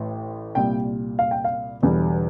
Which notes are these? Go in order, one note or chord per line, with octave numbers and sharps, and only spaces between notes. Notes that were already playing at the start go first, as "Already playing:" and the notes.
Already playing: A1 A2 E3
C2 A#2 G3 G5
F5
G5
F5
E1 E2 D3 G3